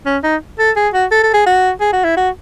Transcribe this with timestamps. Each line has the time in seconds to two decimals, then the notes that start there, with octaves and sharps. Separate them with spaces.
0.06 C#4
0.24 D#4
0.59 A4
0.76 G#4
0.94 F#4
1.12 A4
1.23 A4
1.34 G#4
1.46 F#4
1.81 G#4
1.93 F#4
2.04 E4
2.17 F#4